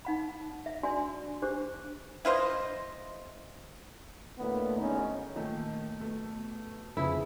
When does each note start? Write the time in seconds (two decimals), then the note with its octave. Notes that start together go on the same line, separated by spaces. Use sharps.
0.05 D#4 F#5 B5
0.66 E5
0.83 D4 F#4 D5 G#5 C6
1.42 D4 G4 C5 D6
2.25 E4 F4 C5 D#5
4.38 D2 A2 D3 A#3 B3
4.78 G#1 C#4 D#4
5.35 A#2 D#3 A3
6.00 B2 A3
6.97 G1 F2 C#3 F3 E4 G#4